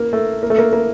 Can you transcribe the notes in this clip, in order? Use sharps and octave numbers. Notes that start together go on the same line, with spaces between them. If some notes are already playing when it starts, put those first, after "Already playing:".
Already playing: A#3
A3
A#3
A3
A#3
A#3